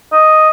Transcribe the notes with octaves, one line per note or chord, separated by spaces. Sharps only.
D#5